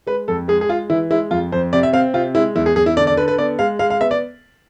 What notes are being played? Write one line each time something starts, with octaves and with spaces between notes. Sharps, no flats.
G#3 B4
F2 A4
G#3 G#4
G#4
G#3 F4
E3 E4
G#3 E4
F2 F4
F2 C5
C3 D5
E5
C4 F5
C3 F4
G#3 E4
E2 E4
G#4
E2 G#4
E4
D3 D5
D5
D3 B4
B4
B3 D5
G#3 F5
G#3 F5
F5
B3 E5
D5